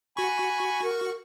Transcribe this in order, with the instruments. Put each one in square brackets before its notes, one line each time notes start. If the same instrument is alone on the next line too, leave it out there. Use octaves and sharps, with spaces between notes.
[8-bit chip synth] F#4 C#6 [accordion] G#5 B5
[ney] A#4